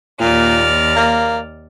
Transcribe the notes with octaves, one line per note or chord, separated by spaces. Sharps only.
D#2 A#2 D5 F6
A#3